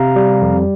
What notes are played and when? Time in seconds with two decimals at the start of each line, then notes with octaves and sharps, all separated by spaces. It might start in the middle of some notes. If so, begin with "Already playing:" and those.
Already playing: C3 F5 A#5
0.16 G3
0.42 F2